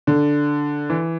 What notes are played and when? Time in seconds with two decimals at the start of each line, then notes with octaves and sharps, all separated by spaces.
0.07 D3
0.90 E3